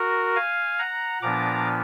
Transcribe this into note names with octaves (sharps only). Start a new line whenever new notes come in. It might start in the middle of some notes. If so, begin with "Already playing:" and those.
Already playing: F#4 A#4
F5 G#5
F#5 A#5
A#2 F3 B3 D4 A#5 D6